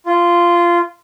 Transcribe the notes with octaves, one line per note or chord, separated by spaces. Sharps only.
F4